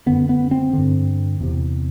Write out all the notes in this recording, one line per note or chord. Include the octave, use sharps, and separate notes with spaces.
F#2 D3 B3
B3
C4
G2 D3
E2 C3